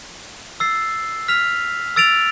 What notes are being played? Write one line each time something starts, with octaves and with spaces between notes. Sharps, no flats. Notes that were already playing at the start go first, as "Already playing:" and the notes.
E6 A6 C7
F6 B6 F7
E6 A6 D7 F7